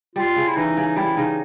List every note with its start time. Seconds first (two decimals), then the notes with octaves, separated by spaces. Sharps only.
0.15 G3 F4
0.36 C#3
0.48 E4
0.56 E3 D#4
0.77 C#3
0.97 G3 E4
1.17 C#3 D#4